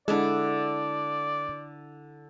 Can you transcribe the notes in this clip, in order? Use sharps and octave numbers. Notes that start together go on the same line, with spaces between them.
D3 G#3 D4 E4 A4 D5